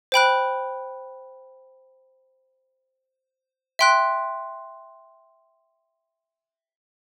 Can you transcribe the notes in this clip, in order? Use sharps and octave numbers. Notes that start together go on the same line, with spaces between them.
C5 G5 B5 F#6
E5 G5 C6 F#6